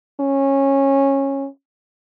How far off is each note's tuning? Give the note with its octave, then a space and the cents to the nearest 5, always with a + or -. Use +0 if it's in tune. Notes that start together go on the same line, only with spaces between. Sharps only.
C#4 -15